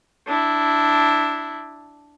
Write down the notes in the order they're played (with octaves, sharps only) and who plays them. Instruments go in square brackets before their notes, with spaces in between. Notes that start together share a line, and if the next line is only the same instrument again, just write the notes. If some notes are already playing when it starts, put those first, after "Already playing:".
[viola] D4 E4